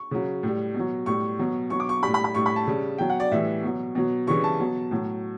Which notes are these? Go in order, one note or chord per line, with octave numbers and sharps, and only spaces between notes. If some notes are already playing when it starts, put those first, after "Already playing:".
Already playing: C#6
C#3 F#3
A2 G3
B2 F#3
A2 G3 C#6
B2 F#3
B2 F#3 C#6
D6
C#6
G3 B5
A2
B5
B5
A2 G3 C#6
B5
A5
C#3 G3
B2 F#3 G5
F#5
D5
A2 E3 G3 E5
B2 F#3
B2 F#3
C#3 E3 G3 C#6
A5
B2 F#3
A2 F#3